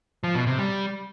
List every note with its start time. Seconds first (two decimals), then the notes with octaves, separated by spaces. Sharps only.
0.24 F3
0.35 B2
0.47 C3
0.58 G3